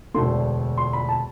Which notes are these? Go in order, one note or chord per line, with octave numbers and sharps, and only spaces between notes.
E1 D2 D3 A3 C6
C6
B5
A5